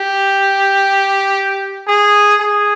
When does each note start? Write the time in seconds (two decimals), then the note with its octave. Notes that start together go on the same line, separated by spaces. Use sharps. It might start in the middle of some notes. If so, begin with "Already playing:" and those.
Already playing: G4
1.88 G#4
2.40 G#4